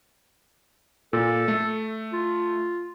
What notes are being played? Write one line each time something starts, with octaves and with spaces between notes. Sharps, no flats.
A#2 A4
A3
F4